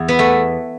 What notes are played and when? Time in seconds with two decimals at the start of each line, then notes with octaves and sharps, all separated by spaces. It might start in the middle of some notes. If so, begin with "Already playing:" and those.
Already playing: E2
0.08 B3
0.19 A3